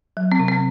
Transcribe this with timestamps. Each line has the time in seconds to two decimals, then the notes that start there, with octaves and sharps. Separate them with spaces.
0.17 F#3
0.32 C4
0.39 C3
0.48 C4